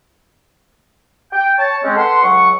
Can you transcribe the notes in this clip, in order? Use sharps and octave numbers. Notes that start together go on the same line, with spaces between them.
G5
C#5 A5
G#3 C4 C#4
A4 B4 F#5 C6
C#2 F#3 F#5 C#6